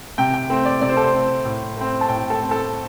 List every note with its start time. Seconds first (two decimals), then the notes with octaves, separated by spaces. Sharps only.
0.18 C3 G5
0.34 G5
0.50 A3 C4
0.65 D5
0.81 C3 D5
0.89 C5
0.97 A4
1.04 C5
1.13 A3 C4
1.45 A2
1.77 A3 C4
2.01 A5
2.08 A2 G5
2.30 A4
2.40 A3 C4
2.51 A4